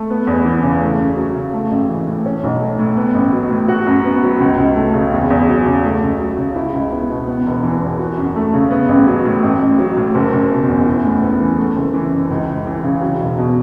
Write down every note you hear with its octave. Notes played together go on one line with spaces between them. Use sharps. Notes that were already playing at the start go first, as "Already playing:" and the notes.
Already playing: A3
B3
E2
E3
C#3
A3
F#2
F#3
C#3
A3
A1
E3
A2
C#4
B1
A3
A2
B3
A1
F#3
A2
F#4
F#2
B3
F#3
C#2
C#2
A3
C#3
E2
E2
F#3
C#3
A3
C#2
F#3
C#3
E4
C#2
B3
B2
B3
E1
E3
E2
F#4
F#2
A3
C#3
B3
A1
F#3
A2
A1
A1
F#3
A2
F#1
F#1
B2
E2
E4
A2
B3
E3
A3
F#1
E3
F#2
C#2
C#2
E3
C#3
F#3
E1
B2